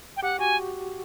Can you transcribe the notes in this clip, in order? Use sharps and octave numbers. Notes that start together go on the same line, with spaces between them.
G5
G4 F#5
F#4 G#5